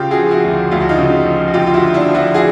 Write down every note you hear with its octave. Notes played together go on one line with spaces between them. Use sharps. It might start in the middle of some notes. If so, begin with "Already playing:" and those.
Already playing: C#3 F4 G4
F#4 G#4
F3
E4 F#4
D2
D2 F4
F#4
D#4 F4
C#3
F3
F#4
D2 F4 G4
F4
E4 F#4
D3
D4 E4
F3
E4 F#4
F#4 G#4